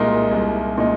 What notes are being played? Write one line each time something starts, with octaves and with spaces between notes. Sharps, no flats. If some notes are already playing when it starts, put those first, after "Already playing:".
Already playing: C2 A#2 G#3 D#4 A#4
C2
A#2 G#3 D#4